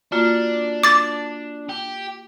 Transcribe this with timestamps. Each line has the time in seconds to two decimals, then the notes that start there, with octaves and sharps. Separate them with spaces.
0.12 A#3 D4 F4 F#4
0.84 D6 A6
1.69 G4